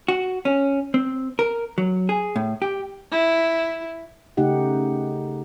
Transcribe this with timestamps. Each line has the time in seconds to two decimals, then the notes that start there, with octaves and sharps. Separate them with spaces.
0.08 F#4
0.45 C#4
0.94 C4
1.39 A#4
1.78 F#3
2.09 G#4
2.36 A2
2.62 G4
3.11 E4
4.37 C#3 A3 D#4 G4 F#5